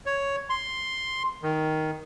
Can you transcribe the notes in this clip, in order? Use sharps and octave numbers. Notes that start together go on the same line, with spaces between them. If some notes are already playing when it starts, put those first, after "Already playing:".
C#5
C6
D#3